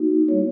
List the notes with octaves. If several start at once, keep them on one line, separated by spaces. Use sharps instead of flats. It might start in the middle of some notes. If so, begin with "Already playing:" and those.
Already playing: A#3 D#4 F#4
G3 B3 E4 C#5